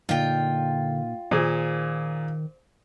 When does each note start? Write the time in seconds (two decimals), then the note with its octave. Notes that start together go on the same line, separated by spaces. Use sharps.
0.09 A#2 D3 D#4 F4 G5
1.31 A#2 D#3 G#4 C5